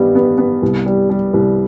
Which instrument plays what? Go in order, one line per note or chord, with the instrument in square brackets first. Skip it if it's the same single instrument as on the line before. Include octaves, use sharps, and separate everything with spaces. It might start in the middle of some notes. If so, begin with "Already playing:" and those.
Already playing: [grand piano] G2 D#3 G3 B3
B3
B3
C2
G3
G3
C2